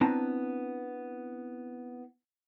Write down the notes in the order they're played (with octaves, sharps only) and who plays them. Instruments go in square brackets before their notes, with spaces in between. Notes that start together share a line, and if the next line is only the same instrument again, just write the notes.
[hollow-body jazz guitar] B3 C4 D4 E4 A5 A#5